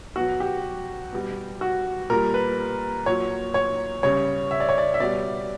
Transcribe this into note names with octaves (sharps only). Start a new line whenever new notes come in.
B2 F#3 F#4
G4
B2 G3
F#4
A#2 G3 A#4
B4
A#2 F#3 C#5
C#5
C#3 G3 C#5
E5
D5
C#5
D5
E5
B2 G3 D5